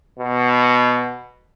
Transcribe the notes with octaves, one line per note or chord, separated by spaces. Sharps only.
B2